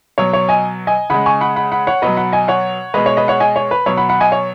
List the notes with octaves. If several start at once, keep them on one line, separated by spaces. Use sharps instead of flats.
B2 F#3 C#5
C#5
D#5 G#5
D#5 G#5
C#3 G#3 F#5 B5
G#5 C#6
F#5 B5
F#5 B5
F#5 B5
C#5 F#5
B2 F#3 B4 D#5
F#5 B5
D#5 G#5
C#5 F#5
B2 G#3 B4 D#5
C#5
B4 D#5
C#5 F#5
D#5 G#5
C#5
B4
B2 F#3 C#5
F#5 B5
F#5 B5
D#5 G#5
C#5